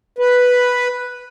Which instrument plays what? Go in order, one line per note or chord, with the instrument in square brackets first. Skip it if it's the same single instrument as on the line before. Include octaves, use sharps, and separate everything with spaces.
[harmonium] B4